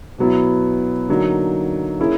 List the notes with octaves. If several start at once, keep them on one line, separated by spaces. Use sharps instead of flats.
B2 F#3 B3 E4
D3 F#3 A#3 D#4
A#3 C#4 E4 G#4